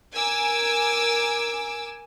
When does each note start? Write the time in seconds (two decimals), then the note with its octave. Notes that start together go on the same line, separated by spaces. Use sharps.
0.14 A#4 G#5 D6 E6